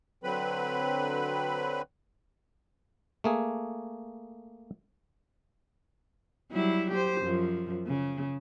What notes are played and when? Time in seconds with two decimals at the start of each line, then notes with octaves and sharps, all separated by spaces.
0.24 D3 F#3 C4 B4 B5
3.24 A3 A#3 G#4
6.51 F#3 G3 E4
6.91 G4 C5
7.20 F#2 F3
7.87 C#3